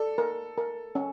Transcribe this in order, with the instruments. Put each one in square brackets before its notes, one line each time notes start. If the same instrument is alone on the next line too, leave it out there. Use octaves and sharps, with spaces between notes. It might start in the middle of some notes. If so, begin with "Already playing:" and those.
Already playing: [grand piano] A4 [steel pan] D5
[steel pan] A#4
A#4
C#4